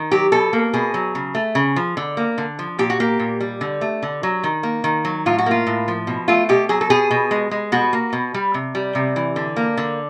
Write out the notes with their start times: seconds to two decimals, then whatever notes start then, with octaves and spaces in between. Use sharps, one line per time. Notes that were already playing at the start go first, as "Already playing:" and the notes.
Already playing: D#3
0.12 F#3 G4
0.32 B2 A4
0.53 A#3
0.73 B2 G#4
0.94 F#3
1.15 C#3
1.35 A3
1.55 C#3
1.76 F3
1.97 D3
2.17 A#3
2.38 D3
2.59 F3
2.79 A#2 G4
2.90 F#4
3.00 A#3 G4
3.19 A#2
3.40 G3
3.61 D3
3.81 A3
4.03 D3
4.23 F#3
4.44 D#3
4.63 A#3
4.84 D#3
5.05 F#3
5.26 A2 F4
5.38 F#4
5.46 A#3 F4
5.67 A2
5.88 F3
6.07 B2
6.28 A3 F4
6.49 B2 G4
6.69 F#3 G#4
6.81 A4
6.90 B2 G#4
7.11 B2
7.31 G#3
7.51 G#3
7.72 B2 F#4
7.93 A#3
8.13 B2
8.34 G3
8.54 C3
8.75 G3
8.95 C3
9.16 E3
9.36 D3
9.56 A#3
9.77 D3